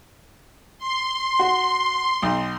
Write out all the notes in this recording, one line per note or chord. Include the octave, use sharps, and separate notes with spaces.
C6
F#4
B1